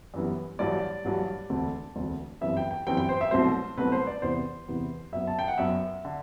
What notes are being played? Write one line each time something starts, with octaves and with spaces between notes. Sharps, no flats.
F#2 E3 G3 B3
A1 G2 F#3 D5
A1 G2 F#3
E1 D2 D3 A3 C4
E1 D2 D3 A3 C4
G1 F#2 E3 G3 C4 E5
G5
G5
G1 F#2 E3 G3 C4 G5
G5
C5
E5
C2 B2 F#3 A3 C4 C5
C2 B2 F#3 A3 C4 B4
C5
D5
E2 C3 E3 B3 C5
E2 C3 E3 B3
F#2 F#3 B3 E5
A5
G5
F#5
F#2 F#3 B3 E5
D3